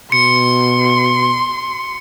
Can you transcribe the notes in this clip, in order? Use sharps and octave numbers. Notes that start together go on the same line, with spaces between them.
B2 C6 C#7